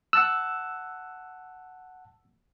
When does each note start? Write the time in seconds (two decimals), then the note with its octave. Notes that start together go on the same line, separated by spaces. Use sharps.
0.13 F#5 A5 E6 F#6